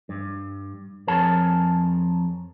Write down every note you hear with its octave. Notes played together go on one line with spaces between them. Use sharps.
G2
F2 G#4 A#4 C#5 A5